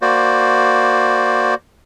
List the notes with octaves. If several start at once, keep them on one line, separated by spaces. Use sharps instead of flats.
A#3 F#4 C5 D5